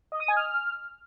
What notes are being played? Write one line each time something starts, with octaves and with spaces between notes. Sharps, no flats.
D#5
D#6
G#5
F6